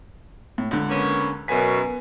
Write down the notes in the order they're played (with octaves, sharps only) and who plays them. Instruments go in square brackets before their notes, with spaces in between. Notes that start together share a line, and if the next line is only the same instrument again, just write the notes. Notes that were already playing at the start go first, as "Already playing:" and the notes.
[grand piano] A2
C#2 D3
[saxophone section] A#3 B3 C#4
[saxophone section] F#2 B2 [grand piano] B3 G#5 B6